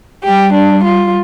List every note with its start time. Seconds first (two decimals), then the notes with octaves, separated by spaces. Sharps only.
0.24 G3 G4
0.54 D4
0.84 F4